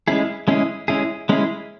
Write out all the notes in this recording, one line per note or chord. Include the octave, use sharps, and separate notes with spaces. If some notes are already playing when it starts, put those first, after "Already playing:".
G#3 C#4 E4 G#4
G#3 C#4 E4 G#4
G#3 C#4 E4 G#4
G#3 C#4 E4 G#4